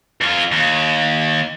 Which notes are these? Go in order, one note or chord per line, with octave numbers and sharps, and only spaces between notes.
F2 F4
D#2